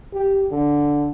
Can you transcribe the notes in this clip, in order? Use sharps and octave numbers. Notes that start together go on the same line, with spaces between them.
G4
D3